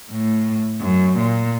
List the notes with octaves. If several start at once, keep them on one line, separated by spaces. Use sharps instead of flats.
A2
F#2
A#2